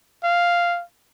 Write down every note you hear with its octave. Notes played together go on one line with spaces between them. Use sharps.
F5